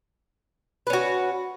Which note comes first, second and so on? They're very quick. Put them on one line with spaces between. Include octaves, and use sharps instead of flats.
B4 C#4 F#4